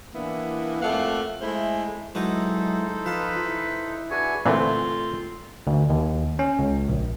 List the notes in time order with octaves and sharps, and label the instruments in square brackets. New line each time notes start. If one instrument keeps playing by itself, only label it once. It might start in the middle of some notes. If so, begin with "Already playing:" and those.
[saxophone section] E3 A#3 B3 D4 E4
F2 A3 A#3 F5 F#5
G#3 A3 E4 G#4 C5
[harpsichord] F#3 F#4 B4 [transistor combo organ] G#3 E4 [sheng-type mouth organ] D#4 A4 C5
[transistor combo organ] F3 F4 [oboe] B4 [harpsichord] F5 A5
[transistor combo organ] E4
[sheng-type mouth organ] D4 F#4 B4 [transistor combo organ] G#4 E5 C#6 [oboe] G#5
[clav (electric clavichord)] A#2 D3 E3 [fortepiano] A3 C4 [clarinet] F4
[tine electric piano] D2
D#2
C#4
C#2
A#1